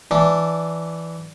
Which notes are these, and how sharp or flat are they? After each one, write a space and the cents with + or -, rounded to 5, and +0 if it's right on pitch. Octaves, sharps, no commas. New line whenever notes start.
E3 +0 D4 +0